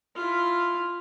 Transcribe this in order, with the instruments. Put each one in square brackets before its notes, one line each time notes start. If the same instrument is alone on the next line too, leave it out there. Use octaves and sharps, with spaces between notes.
[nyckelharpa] E4 F4